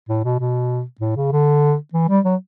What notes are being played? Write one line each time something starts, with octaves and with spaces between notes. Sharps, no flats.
A2
B2
B2
A2
C#3
D3
E3
G3
F#3